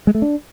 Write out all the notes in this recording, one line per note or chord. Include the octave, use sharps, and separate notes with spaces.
G#3
A3
D4